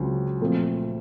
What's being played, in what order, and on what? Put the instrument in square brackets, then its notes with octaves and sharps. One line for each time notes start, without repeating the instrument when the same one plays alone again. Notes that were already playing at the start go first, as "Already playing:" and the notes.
Already playing: [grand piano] C#2 C#3 F#3 C4 F4
A#2 F3 A3 C4